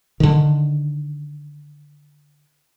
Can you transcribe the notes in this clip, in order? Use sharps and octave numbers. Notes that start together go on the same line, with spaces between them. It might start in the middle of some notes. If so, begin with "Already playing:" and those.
D3 D#3